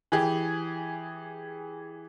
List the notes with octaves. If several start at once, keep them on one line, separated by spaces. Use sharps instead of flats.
E3 G4 G#4